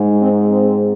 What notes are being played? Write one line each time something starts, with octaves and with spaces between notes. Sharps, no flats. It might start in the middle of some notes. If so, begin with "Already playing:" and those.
Already playing: G#2 G#3
C4
C4